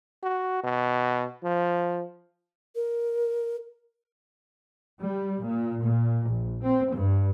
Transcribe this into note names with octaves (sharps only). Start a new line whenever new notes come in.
F#4
B2
F3
A#4
G3
A#2
A#2
A#1
C4
G2